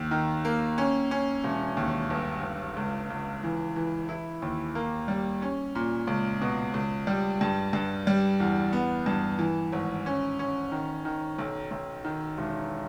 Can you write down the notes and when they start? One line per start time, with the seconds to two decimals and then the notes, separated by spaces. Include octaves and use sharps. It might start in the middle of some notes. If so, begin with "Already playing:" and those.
Already playing: D#2
0.11 D#3
0.45 A#3
0.78 C#4
1.11 C#4
1.44 E1
1.77 D#2
2.10 G1
2.43 G1
2.76 C#2
3.10 C#2
3.43 E3
3.76 E3
4.09 E4
4.42 D#2
4.75 A#3
5.08 G3
5.42 C#4
5.75 A#2
6.07 C#2
6.41 B2
6.74 C#2
7.07 G3
7.41 G2
7.73 G2
8.07 G3
8.40 E2
8.73 B3
9.06 G2
9.39 E3
9.73 G#1
10.06 C#4
10.39 C#4
10.72 D#3
11.05 D#3
11.38 B1
11.71 B1
12.04 D#3
12.37 E1